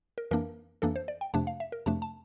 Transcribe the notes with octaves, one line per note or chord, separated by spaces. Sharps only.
A#4
F2 E3 A#3 D4 A#4
F2 E3 A#3 D4 A4
C5
D5
G5
F2 C3 F3 A3 D4 A5
F5
E5
A#4
F2 C3 F3 A3 D4 A5
A5